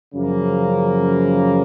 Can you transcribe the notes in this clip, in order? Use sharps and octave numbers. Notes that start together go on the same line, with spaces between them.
F#2 C#3 F3 A#3